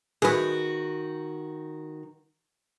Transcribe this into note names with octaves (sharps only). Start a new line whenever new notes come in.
D#3 F#4 G#4 B4